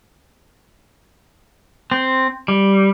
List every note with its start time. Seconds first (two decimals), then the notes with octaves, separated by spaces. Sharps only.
1.92 C4
2.48 G3